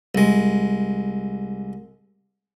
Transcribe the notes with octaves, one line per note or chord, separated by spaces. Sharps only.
C2 G#3